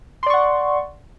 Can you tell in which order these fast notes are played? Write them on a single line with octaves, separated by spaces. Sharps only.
C6 D5 C#6 F#5